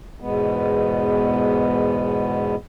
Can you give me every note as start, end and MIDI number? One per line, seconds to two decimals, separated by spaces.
0.20 2.55 40
0.20 2.55 44
0.20 2.55 47
0.20 2.55 56
0.20 2.55 59